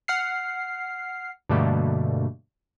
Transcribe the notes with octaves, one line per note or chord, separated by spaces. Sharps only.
F#5 F6 C7
G2 B2 D3 G3 A3 A#3